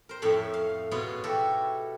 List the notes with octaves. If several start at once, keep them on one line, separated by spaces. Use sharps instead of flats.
A#4 C5
F2 A2 A3 C#5 B5
F5
G#2 B2 B3 F4 C#5 F5
E4 F#4 G4 A4